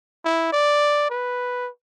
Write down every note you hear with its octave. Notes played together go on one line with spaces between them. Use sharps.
E4
D5
B4